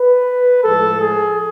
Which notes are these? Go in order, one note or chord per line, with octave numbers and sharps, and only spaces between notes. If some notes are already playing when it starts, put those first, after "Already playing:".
Already playing: B4
A2 F3 G#3 A4
G#4